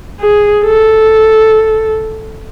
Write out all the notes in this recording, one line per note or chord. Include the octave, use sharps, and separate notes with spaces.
G#4
A4